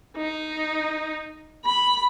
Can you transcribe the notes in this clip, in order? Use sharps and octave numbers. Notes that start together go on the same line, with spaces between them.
D#4
B5